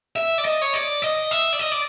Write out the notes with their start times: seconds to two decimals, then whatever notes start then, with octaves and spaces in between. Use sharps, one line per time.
0.16 E5
0.38 D5
0.45 D#5
0.62 C#5
0.74 D5
1.02 D#5
1.31 E5
1.53 D5
1.59 D#5
1.72 D5